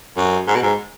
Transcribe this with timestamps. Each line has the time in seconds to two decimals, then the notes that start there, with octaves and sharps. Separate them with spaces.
0.17 F#2
0.47 G#2
0.56 B2
0.63 G#2